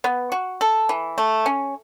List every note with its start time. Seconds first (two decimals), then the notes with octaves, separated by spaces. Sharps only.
0.04 B3
0.32 F#4
0.61 A4
0.89 E3
1.18 A3
1.46 C#4